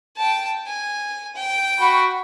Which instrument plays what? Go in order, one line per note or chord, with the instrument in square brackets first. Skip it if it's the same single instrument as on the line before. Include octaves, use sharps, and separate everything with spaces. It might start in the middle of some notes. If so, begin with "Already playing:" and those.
[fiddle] G5 A5
G#5
G5
[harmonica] F#4 B5 C#6